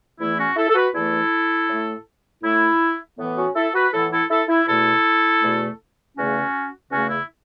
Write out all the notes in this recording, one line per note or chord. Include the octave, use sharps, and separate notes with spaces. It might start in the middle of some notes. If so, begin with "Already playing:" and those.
E2 E3 A3 E4
C#4 F#4
E4 A4
A4
F#4 B4
E2 E3 A3 E4 A4
A2 A3
A2 A3 E4
A2 E3 B3
C#4 F#4
E4 A4
F#4 B4
A2 E3 B3 E4 A4
E4 A4
E4 A4
E4
E2 B2 A3 E4 A4
E2 B2 A3
E2 C#3 A3 C#4 F#4
E2 C#3 A3 C#4 F#4
E4